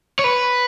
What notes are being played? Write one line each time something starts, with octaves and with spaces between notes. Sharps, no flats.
C#5
B4